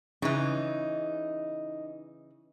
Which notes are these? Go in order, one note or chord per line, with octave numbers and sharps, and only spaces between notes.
C#3 E3 D#4